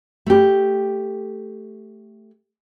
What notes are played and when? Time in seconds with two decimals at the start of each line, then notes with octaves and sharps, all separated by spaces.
0.26 A3 G4